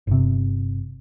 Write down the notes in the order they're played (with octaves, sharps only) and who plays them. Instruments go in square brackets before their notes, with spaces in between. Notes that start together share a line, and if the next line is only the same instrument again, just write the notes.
[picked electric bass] G1 C3